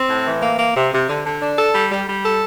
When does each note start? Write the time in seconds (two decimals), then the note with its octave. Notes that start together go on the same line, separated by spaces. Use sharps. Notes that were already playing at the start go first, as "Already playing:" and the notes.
Already playing: C4
0.09 A2
0.26 E3
0.42 A#3
0.59 A#3
0.76 C3
0.93 C3
1.09 D3
1.25 D3
1.42 D4
1.58 A4
1.74 G3
1.91 G3
2.08 G3
2.25 A4